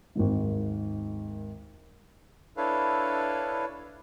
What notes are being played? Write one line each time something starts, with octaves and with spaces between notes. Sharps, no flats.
G#1 D#2 G#2
D4 E4 A4 B4 C#5 F5